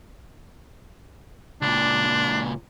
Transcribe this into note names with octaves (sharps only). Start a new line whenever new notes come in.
C#2 A#2 D4